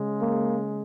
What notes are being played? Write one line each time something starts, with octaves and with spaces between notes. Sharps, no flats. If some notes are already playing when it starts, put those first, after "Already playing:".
Already playing: C#3 G#3
A#3